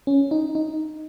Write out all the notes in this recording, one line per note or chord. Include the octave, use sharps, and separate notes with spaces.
C#4
D#4
D#4